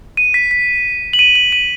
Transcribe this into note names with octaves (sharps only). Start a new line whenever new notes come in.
D#7
B6
B6
F#7
D#7
F#7
D#7